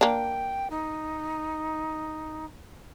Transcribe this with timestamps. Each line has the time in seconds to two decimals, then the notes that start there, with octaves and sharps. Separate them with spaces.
0.01 A#3 D4 G5
0.70 D#4